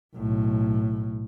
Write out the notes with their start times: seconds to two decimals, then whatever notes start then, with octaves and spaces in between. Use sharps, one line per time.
0.15 B1 A2